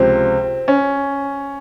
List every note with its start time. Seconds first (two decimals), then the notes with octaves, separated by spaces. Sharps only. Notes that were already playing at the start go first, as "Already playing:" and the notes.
Already playing: C#2 C3 F3 C4
0.68 C#4